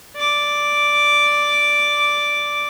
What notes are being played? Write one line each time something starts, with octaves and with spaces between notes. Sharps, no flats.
D5 D6